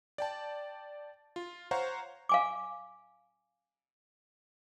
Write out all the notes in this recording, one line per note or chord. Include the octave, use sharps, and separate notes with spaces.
D5 G5 A5
F4
C5 C#5 F5 F#5 A#5 C#6
F5 G#5 D6